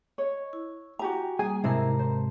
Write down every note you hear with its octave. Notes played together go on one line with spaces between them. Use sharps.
C#5 D#5
E4
F#4 G4 G#5 A#5
G3 A#3 G#4 G#5 D#6
G#2 C3 C4 E4 A#4 A5 A#5
C5